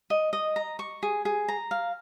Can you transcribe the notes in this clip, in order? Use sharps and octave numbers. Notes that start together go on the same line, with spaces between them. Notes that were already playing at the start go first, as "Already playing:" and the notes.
D#5
D#5
A#5
C#6
G#4
G#4
A#5
F5